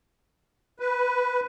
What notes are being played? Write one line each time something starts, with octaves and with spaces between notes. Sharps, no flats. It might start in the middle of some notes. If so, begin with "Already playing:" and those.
B4